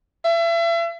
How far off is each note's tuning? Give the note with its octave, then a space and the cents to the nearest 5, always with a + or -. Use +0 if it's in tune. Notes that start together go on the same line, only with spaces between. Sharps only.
E5 +35